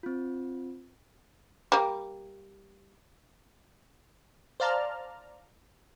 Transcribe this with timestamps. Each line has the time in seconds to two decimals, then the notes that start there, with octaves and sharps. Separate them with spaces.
0.03 C4 F4
1.72 G3 A#3
4.60 C5 D5 F5 A5 A#5 F6